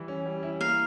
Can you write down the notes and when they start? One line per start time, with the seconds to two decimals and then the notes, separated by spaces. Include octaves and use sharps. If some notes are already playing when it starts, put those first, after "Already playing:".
Already playing: E3 G3 E4
0.08 C#4
0.26 G3
0.43 E4
0.61 A#3 F5